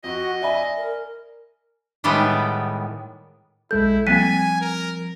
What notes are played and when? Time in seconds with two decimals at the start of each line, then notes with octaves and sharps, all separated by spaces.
0.04 F2 F#4 D#5
0.41 D5 E5 G#5 B5
0.78 A#4
2.04 A2 D#3 G3 G#3 B3
3.71 B1 G#3 E4 A4 G6
4.07 F3 G3 A#3 C4 G#5 B6 D#7
4.61 A#4